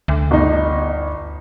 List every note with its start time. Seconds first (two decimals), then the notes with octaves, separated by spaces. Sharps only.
0.08 D2
0.31 G1 D#4